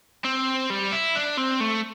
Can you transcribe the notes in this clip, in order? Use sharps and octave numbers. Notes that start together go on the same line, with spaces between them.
C4
G3
E4
D4
C4
A3